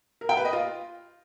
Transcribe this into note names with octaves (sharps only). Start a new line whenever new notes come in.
A#4
G5
B4
D#5
F4